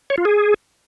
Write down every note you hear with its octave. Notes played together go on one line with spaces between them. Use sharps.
C#5
F4
G#4